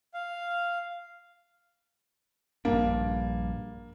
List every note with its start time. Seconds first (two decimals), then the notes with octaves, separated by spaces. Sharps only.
0.14 F5
2.65 A#1 G2 A#3 D4